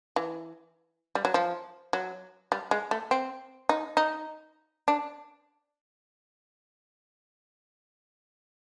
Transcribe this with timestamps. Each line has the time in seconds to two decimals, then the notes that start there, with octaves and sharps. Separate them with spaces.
0.16 E3
1.15 G3
1.25 F#3
1.34 F3
1.93 F#3
2.52 G3
2.71 G#3
2.91 A3
3.11 C4
3.69 D#4
3.97 D#4
4.88 D4